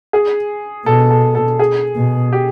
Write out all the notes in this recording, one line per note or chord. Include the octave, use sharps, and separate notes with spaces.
G#4
B2 A4
A4
A4
G#4
B2
G4